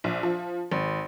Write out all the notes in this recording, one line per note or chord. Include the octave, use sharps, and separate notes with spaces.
A#1
F3
G#1